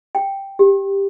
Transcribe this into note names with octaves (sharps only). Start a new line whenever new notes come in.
G5
G4